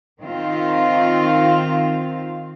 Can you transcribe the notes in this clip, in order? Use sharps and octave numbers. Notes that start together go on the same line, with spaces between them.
D#3 C4 F4